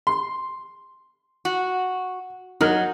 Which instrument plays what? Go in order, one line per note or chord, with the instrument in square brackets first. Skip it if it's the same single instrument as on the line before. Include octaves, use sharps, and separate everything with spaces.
[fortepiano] C6
[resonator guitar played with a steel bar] F#4
[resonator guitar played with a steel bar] F#3 [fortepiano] D#4 A#4 F6